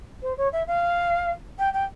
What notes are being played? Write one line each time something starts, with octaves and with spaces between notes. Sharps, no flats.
C5
C#5
E5
F5
G5
G5